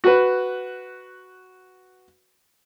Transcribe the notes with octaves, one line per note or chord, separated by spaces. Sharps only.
F#4 B4